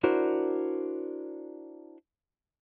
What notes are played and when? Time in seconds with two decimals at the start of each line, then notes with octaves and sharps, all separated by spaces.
0.03 D4 E4 F#4 A#4 C5 D5